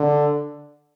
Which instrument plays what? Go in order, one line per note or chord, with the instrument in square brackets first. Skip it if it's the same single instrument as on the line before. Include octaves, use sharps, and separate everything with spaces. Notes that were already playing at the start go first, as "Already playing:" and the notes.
Already playing: [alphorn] D3